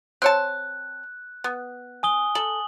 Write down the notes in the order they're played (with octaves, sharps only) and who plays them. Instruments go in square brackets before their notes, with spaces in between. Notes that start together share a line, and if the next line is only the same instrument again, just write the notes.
[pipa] C4 C#5 A5 [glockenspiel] F#6
[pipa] B3
[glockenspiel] G#5 D#6 G7
[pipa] A4 [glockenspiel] F#7